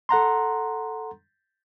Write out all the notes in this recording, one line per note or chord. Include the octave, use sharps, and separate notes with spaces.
A4 F#5 A#5 C6